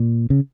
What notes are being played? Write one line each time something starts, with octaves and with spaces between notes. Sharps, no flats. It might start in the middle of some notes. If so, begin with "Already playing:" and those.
Already playing: A#2
C#3